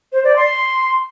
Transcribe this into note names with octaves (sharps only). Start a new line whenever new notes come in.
C5
D5
C6